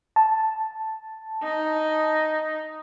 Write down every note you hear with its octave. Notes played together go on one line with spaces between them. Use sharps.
A5
D#4